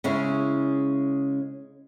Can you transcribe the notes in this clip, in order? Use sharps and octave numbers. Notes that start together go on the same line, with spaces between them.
C#3 G#3 C#4 E4